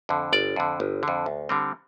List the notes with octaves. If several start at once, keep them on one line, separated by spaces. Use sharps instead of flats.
F2 D3
G1 D5
F2 D3
G1
F2 D3
D2
D3 G3 C4